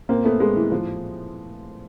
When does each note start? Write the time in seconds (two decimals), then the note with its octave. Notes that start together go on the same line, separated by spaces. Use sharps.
0.09 A#2 A#3 C4
0.24 A3 B3
0.40 G#3 A#3
0.56 E3
0.71 A2 E3 F3